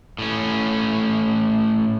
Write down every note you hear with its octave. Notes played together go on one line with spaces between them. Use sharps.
A2 C#4